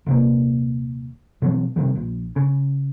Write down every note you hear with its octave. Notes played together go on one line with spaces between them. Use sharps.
D#1 C3 A#3
B2 E3 F#3 C4
C3 D#3 F3 G3
A#1
C#3